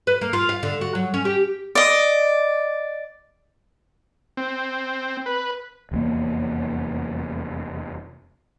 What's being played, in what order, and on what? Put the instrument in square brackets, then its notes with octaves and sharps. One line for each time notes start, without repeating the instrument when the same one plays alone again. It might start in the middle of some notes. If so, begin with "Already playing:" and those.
[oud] B4
A#3
F4
F5
D3
F#4
F#3
C#4
G4
[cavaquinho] D5 D#5
[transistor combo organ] C4
B4
[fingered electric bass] F1 E2 G2 A#3